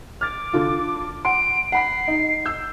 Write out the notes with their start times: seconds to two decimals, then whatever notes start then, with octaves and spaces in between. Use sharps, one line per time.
0.21 D6 F6 A6
0.53 D3 F4
1.25 F#5 C6 D7
1.72 F#5 B5 B6 C7
2.08 D#4
2.46 E6 G6